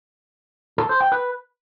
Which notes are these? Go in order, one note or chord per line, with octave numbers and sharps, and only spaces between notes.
A4
C5
G5
B4